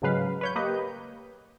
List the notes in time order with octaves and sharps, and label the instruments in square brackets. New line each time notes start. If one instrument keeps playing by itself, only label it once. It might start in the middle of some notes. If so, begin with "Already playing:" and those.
[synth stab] G#2 C#3 F#3 G#3 B4 F5
B4 C#5 G6
A#3 G4 B4 D#5